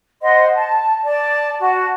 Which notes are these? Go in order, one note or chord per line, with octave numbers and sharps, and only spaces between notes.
C5 D#5 F#5 C6
A5
D5 A5
F#4 A5